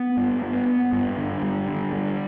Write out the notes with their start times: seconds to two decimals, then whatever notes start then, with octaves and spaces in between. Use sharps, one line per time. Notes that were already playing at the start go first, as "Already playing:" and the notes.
Already playing: B3
0.17 G2
0.42 B3
0.66 B3
0.92 G2
1.17 D3
1.43 G3
1.68 D3
1.93 G3